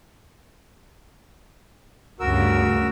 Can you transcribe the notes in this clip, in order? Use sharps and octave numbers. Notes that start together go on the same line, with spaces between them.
D2 G2 C#3 F#4 A#4 E6